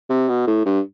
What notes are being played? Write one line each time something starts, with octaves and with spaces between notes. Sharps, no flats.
C3
B2
A2
G2